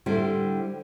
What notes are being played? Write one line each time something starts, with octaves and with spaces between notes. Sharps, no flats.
D3 G3 E4 G4 C5